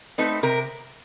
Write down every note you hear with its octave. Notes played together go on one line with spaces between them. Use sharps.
A3 C4 D#4 B4
C3 A#4